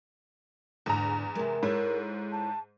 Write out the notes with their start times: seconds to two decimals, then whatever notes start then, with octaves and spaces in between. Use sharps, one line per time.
0.86 E2 G#2 D3 A#5
1.35 C3 G#3 A#4
1.63 G#2 E4 A4 C#5
2.31 A5